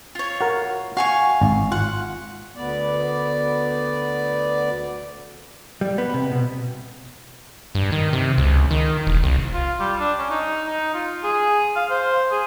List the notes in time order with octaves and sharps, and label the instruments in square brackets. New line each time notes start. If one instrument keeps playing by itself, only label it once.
[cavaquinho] F4 C#5
[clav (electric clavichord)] F#4 A#4
[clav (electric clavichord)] F#4 [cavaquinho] F5 G#5 C#6
[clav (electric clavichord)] G#1
[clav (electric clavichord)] F4 [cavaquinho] F#5
[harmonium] D2 B3 D5
[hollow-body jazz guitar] G3
B3
C3
B2
[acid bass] G2
D#3
C3
C#2
D#3
E1
C2
[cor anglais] F4
G3
D4
C#4
D#4
D#4
F4
G#4
F5
C5
G#4